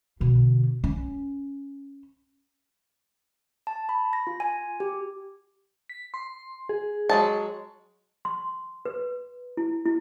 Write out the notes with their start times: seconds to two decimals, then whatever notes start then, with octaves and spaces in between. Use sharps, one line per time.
0.20 B2 D3
0.84 C#4
3.67 A5
3.89 B5
4.13 A#6
4.27 F4
4.40 G#5
4.80 G4
5.90 B6
6.14 C6
6.69 G#4
7.10 F#3 G#3 A5
8.25 C6
8.85 B4
9.57 E4
9.86 E4